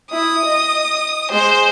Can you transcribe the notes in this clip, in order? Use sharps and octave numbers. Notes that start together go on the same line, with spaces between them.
E4 D#6
D#5
G#3 C5